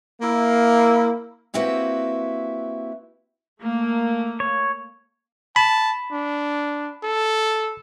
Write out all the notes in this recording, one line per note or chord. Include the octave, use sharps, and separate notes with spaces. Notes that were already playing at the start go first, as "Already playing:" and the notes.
A#3 E4
A#3 C4 E4 F#4 G4 B4
A3 A#3
C#5
A5 B5
D4
A4